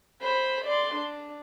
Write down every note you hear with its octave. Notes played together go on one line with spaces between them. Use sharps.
C5 B5
D5 C6
D4